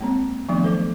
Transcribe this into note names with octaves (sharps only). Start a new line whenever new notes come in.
G#3 A#3 C4
D#3 F3 F#3 A3 B3 D4
A4 C5 D6